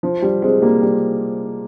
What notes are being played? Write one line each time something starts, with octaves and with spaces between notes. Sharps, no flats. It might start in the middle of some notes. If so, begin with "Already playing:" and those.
F3
G3
G#3 C4
G3 A#3
G3